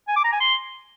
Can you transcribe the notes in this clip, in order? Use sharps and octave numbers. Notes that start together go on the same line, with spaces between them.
G#5
D6
A#5
G#5
C6